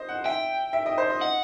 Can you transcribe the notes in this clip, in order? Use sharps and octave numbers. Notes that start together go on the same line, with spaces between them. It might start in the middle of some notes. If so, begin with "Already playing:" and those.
Already playing: C5 D#5
F#5
E5 G5
E5
D#5
C5
D#5
F#5